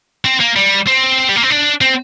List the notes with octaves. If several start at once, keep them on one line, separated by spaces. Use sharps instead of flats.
C4
A#3
G3
C4
G3
A#3
C4
D4
C4